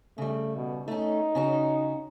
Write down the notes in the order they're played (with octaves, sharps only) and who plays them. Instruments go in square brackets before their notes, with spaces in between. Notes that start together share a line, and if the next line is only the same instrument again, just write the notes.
[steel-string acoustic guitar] C#3 G3 [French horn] A3
[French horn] B2
[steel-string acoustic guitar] A3 C#4 [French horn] D#4
[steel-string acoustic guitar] C#3 C#4 F#4